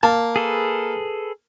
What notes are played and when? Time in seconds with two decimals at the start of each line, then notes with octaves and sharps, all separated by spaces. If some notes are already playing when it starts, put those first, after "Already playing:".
0.03 A#3 A5
0.36 G#4 A4 B4